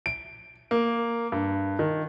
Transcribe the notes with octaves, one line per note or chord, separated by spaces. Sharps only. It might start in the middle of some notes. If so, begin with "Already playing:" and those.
D7
A#3
G2
D#3